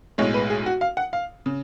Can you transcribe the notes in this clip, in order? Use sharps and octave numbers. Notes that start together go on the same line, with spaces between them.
B1 A2 G#3 C#5
B4
G#4
F#4
F5
F#5
F5
C#3